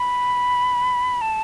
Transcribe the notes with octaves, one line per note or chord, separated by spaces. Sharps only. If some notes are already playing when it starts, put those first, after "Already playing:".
Already playing: B5
A5